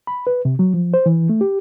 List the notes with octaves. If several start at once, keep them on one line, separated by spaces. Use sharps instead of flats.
B5
B4
C3
F#3
F3
C5
E3
A3
G4